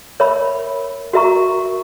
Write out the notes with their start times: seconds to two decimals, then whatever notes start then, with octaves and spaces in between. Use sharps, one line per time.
0.20 A#4 C#5 E5 B5
1.13 F#4 A#4 E5 A#5 C#6